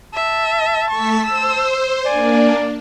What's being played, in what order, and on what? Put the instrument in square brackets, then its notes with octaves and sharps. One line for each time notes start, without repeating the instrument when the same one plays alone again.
[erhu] E5 [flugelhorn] A5
[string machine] A3 E6 B6 [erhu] C#6
[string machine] C5 [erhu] E6
[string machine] A#3 D4 [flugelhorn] D5 [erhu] G#5